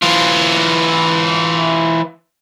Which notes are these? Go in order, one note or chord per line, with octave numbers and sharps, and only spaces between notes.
E3 F4